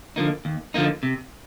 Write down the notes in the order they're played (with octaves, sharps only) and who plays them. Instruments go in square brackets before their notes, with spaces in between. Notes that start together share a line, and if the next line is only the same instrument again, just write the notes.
[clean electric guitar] D3 F3 A#3 D#4
D#2
D3 F3 A#3 D#4
C3